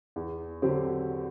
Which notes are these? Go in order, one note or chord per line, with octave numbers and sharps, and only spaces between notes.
E2
D3 F#3 C4 G4